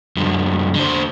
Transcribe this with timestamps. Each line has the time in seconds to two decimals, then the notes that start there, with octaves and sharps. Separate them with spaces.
0.17 F#2 D3
0.75 D3 C5